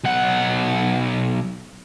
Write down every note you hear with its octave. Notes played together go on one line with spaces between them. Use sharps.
B1 F#5